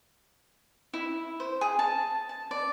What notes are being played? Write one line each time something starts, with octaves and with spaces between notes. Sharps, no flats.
E4
C5
G#4
A5
A5
D5